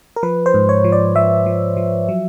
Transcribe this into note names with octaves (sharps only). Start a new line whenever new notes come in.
A#4
F3 B4
C5
G#2
C#5
F3
D5
F3 E5
F3
F3
F#3